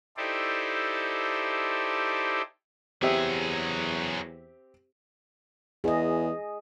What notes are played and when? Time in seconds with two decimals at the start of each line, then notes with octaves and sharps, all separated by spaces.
0.17 D#4 E4 G4 A4 C5 D5
3.02 E2 F#3 C4 G4 G#4 E5
5.84 E2 G#4 D#5